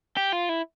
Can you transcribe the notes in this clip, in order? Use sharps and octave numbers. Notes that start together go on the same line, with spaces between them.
G4
F4
E4